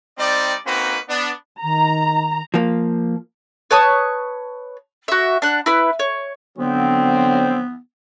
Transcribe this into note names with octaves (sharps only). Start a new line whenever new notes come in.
G3 C4 D#4 D5
A#3 C4 C#4 D#4 F#4 B4
B3 D4
D#3 A#5
F3 A#3
B4 C#5 A5 D#6
F#4 E5
D4 F#5
E4 B4
C#5
D3 F#3 B3 C4